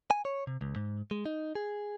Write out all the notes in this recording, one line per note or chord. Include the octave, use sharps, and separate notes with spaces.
G#5
C#5
C3
C#2
G#2
G#3
D#4
G#4